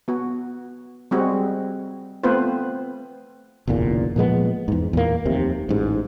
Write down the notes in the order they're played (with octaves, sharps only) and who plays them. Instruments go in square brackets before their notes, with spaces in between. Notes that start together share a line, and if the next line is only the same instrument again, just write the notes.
[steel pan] B3 F#4
G3 G#3 C4 F#4
A3 B3 C4 F4 B4 C5
[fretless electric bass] F#1 B1 E2 A#2
A#2 F3 G#3 B3
E2 G#2
E2 A#2 A#3
F1 D#2 C3
A1 G#2